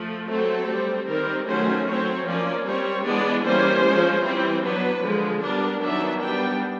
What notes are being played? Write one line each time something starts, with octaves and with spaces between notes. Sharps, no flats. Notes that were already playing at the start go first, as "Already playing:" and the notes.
Already playing: F3 A3
F#3 A3 C4 A4
G3 C4
D#3 G3 C4 A#4
D#3 F#3 A3 C#4 C5
F#3 A3 C4 C#5
F3 A#3 C#4 D5
G3 C4 C#5
E3 G#3 B3 D4 D5
E3 G3 A#3 C#4 C5
F3 G#3 C#4
E3 G3 C4
F#3 B3 D4 B4
D3 F3 G#3
G3 B3 D4 A#4
D#3 F#3 B3 D4 E5
G3 B3 D4 G5